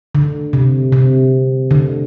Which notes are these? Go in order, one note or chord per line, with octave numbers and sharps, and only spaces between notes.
D3
C3
C3
D3